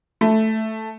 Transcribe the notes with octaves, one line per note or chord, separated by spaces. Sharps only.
A3